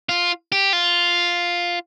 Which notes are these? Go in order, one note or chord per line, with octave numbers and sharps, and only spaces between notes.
F4
G4
F4